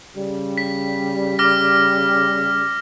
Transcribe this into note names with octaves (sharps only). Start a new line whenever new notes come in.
C#3 G3
B6
D6 F6 A#6